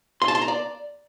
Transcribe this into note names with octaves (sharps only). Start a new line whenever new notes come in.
C6
A5
C6
A#5
D5